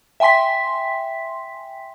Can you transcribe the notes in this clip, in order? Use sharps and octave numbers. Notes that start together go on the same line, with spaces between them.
E5 G5 G#5 C6 B6